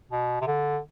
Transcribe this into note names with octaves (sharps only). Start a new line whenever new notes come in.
B2
C3
D3